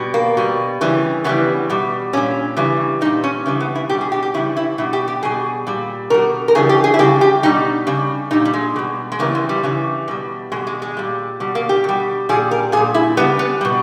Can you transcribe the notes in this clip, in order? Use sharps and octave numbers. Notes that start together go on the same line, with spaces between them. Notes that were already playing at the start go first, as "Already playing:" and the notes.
Already playing: B2 G3
A#3
B2 G3
C#3 E3 G3
C#3 E3 G3 B3
B2 G3
A#2 G3 C#4
C#3 E3 G3
A#2 G3 D#4
C#4
C#3 E3 G3
B3
E4
B2 G3 G4
G#4
G4
G4
C#3 E3 G3 E4
E4
B2 G3 E4
G4
G4
B2 G3 G#4
A#2 G3
B2 G3 A#4
A#4
C#3 E3 G3 G#4
G4
G#4
E4
C#3 G3 G4
G4
B2 G3 D#4
C#3 G3
A#2 G3 D#4
G3
G#3
B2 G3
G#3
C#3 E3 G3 A#3
G#3
G3
C#3 E3 G3
B2 G3
B2 G3 G#3
G#3
G#3
A#2 G3
B2 G3
A#3
G4
B2 G3
A#2 G3 G#4
A#4
A#2 G3 G#4
E4
C#3 G3 B3
B3
B2 G3